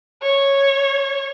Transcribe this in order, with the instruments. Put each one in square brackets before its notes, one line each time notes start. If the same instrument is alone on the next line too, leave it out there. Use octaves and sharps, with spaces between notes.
[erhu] C#5